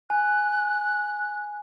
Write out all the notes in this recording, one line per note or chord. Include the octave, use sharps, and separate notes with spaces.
G#5 F#6